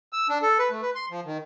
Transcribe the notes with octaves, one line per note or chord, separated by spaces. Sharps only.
E6
D4
A4
B4
A3
B4
C6
F3
D#3